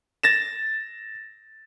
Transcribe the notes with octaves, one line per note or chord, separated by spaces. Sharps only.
A6 A#6 E7